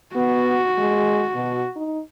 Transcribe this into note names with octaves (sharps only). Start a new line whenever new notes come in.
B3 F#4
G#3
B2
D#4